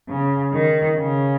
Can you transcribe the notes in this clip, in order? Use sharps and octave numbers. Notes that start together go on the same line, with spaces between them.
C#3
D#3
C#3